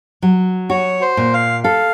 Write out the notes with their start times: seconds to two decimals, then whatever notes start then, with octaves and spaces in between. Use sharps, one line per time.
0.22 F#3
0.70 F#4 C#5
1.01 C5
1.17 A#2
1.34 F5
1.64 A4 F5